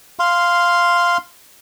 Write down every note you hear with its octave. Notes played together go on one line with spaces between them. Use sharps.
F5 C6